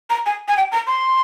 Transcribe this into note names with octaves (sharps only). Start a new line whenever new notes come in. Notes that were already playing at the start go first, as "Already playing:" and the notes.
A#5
G#5
G#5
G5
A#5
C6